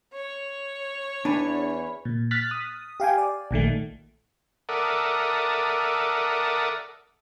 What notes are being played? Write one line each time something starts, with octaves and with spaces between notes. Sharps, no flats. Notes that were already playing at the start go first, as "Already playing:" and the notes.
C#5
E2 D4 B4 G#5
A#2
F6 F#6 A6 B6
D#6
G4 F5 G5 G#5
D5
A#1 A#2 D#3 A3
A4 A#4 D5 E5 F#5 D#6